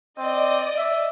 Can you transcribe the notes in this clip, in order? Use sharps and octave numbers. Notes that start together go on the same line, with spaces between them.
C4 D5 D#5
E5